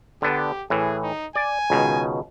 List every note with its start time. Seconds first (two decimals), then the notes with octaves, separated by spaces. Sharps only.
0.22 D3 B3 D4 G4
0.70 A2 E3 G#4
1.02 D#4
1.35 D5 G#5
1.70 C#2 B2 D#3